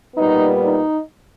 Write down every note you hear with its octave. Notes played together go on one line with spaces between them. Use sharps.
A#2 G3 B3 D#4
D#4